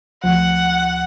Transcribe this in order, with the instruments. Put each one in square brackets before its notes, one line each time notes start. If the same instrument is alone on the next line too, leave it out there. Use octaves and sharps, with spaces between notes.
[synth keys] D2 F3 [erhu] F#5